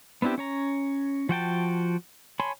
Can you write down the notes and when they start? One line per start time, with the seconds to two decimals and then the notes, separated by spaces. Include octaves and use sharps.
0.22 B3 C4 D4 E4 G4
0.38 C#4 C#5 A#5
1.29 F3 F#4 G5 A5
2.40 C#5 G#5 A5 B5 C6